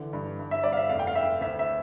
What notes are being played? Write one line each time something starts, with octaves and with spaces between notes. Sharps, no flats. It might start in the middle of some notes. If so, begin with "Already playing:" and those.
Already playing: D3 E3
G2
G2
E5
G2 D5
F5
E5
F1 F5
G5
F5
F1 E5
D2 E5
E5